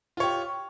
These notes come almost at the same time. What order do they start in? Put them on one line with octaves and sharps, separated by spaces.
F4 C#5 G4